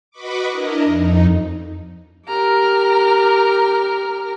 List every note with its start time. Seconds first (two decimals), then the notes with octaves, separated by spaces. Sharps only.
0.11 F#4 B4 D#5 B5 C#6 D6
0.49 D4 E4 A#4 D#5
0.84 F2 D#4
2.27 G4 A#4 A#5 F6